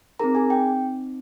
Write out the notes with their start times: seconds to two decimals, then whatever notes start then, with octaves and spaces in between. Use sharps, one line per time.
0.20 C4 D#4 G#4 A#4 A#5
0.35 G#4 G#5
0.50 G5